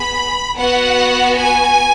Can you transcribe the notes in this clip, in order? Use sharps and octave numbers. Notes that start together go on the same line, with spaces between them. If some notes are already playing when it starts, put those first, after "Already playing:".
Already playing: B3 G#4 B5
B3 F#4 F#5
G#5